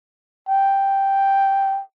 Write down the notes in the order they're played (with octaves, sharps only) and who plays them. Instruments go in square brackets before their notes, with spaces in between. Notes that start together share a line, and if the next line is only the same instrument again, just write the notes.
[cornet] G5